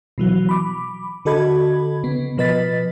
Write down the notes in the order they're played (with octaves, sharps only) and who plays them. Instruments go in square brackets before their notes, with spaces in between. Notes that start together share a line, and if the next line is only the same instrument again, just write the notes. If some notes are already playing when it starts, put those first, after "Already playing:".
[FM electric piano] B2 E3 F#3
B5 D6
D3 F#4 A4 D#5 B5 G#6
C#3 B3
B2 F3 B4 D#5 A6 B6